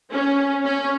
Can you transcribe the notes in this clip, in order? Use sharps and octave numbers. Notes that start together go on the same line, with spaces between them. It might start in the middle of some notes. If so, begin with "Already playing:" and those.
C#4
C#4